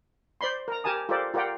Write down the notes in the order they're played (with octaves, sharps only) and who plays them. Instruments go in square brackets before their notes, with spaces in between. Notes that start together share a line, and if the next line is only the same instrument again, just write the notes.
[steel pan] C5 D5 B5 C6
A#4 A#5
G4 A#4 G#5 A5 D#6
F4 G4 A4 A#4 C5 D5
F4 G4 A#4 D5 F#5 G5